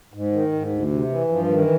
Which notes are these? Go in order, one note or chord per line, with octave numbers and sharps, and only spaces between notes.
G#2
D#3
G#2
D2
C3
E3
G2 F3
D#3
E3